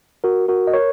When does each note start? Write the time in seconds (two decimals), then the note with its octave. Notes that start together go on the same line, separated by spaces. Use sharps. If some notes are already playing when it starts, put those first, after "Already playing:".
0.24 F#4 A#4
0.48 F#4 A#4
0.67 D#5
0.73 A#4 C#5